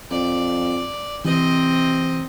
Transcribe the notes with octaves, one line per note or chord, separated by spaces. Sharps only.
F2 D5
C3 E3 C4 D#5